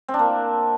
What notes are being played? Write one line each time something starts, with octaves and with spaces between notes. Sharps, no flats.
C4
D4
A#3